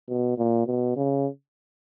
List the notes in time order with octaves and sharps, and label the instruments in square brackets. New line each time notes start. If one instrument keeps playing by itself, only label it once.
[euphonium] B2
A#2
B2
C#3